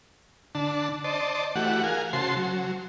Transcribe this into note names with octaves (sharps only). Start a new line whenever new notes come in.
D3 D4 A5
C5 D5 D#5 A5
E3 A3 F#4 G4 F#5
G#4 A#4 F5 G#5
C#3 F#4 C5 A5 C6
F#3